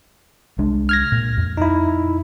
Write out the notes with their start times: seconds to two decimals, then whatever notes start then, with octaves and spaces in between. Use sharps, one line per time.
0.58 C2 G#3 D4
0.89 F6 G#6 A#6
1.12 A#2
1.37 F2
1.57 D#4 E4